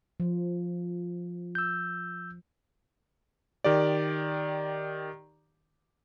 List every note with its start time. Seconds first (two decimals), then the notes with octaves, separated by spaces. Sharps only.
0.20 F3
1.55 E6 G6
3.64 D#3 G4 D5